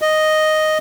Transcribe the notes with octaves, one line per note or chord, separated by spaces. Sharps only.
D#5